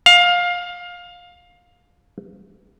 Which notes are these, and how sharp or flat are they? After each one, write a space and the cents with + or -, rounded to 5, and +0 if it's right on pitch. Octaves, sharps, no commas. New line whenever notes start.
F5 +20